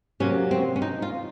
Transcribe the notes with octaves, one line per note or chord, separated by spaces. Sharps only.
C3 F#3 A#3 C#4
C4
C#4
D#4
F4